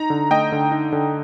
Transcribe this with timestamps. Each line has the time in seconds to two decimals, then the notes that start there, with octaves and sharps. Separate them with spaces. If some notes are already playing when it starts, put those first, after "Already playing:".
Already playing: D#4 A#5
0.10 D3
0.30 A3 D#5 G5
0.52 D3
0.72 D#4
0.92 D3